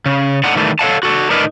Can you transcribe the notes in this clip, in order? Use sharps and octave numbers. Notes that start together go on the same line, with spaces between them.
C#3
A2 D4 D#4 F#5
D#3 E3 G3 A3
A4 C#5 F5 F#5 A5
F#4 A4
A2 D4 D#4 A#4 B4